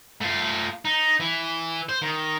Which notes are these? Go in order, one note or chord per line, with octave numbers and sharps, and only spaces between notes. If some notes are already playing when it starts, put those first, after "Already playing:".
A3 F4
D#4
E3
C5
D#3